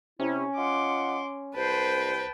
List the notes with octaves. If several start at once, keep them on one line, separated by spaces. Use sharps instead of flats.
C3 C#4 E4
F4 D#5 F#5 C6 D6
C2 B4 C5 G5 A5